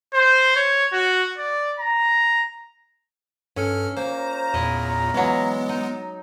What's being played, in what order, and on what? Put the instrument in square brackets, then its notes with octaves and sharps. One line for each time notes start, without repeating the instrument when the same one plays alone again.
[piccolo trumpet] C5
C#5
F#4
D5
A#5
[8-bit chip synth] G2 A4 F6 [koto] C#4
[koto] A#3 [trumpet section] F4 C#5 A#5 [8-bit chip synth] C5
[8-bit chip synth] E2 A#2 [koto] E4 D#5
[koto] E3 F#3 [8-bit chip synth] G#3 B3
[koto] D#4